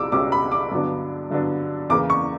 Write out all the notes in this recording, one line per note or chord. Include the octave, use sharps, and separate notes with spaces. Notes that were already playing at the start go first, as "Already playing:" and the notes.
Already playing: C#2 B2 G3 D6 E6
C#2 B2 G3 C#4 D6
B5
D6
G2 D3 F#3 B3 D4
G2 D3 F#3 B3 D4
E2 C#3 E3 A#3 D6
C#6